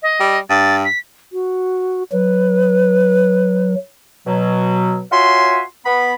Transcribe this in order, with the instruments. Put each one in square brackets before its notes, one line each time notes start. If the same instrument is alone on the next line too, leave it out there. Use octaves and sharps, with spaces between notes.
[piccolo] D#5
[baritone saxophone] G3
[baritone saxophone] G2 [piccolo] A6
[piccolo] B6
[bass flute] F#4
[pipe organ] F#3 [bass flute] B4
[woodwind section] B2 F#3
F4 F#4 C#5 E5 G#5 C6
B3 B5